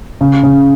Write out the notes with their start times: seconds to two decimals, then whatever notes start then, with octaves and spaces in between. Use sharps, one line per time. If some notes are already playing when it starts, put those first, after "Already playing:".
0.21 C#3
0.43 C#3